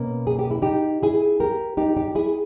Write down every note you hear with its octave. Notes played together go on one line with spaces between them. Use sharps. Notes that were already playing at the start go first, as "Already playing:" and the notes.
Already playing: B2 A#3 C#4
G#4
G4
E4
D#4 G4
E4 G#4
G4 A#4
D#4 G4
D#4 G4
E4 G#4